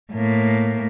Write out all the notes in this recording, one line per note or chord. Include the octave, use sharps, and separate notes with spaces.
A2 A#3